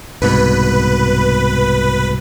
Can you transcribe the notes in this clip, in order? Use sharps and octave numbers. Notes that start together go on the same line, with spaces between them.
C2 G#2 B2 B4